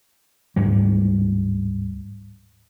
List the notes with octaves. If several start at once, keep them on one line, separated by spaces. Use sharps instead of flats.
D1 B1 G#2 G3